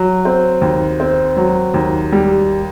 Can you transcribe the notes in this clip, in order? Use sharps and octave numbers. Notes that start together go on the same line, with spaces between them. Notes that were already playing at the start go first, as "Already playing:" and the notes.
Already playing: F#3
C4
D#2
C4
F#3
D#2
G3